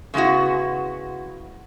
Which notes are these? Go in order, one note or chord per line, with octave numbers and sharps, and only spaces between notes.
C#3 G#3 B3 E4 F#4